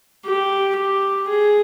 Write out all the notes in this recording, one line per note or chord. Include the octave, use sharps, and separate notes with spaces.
G4
G4
G#4